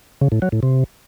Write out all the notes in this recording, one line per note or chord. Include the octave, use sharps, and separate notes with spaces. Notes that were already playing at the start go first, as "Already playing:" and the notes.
C#3
A2
F#3
A2
C3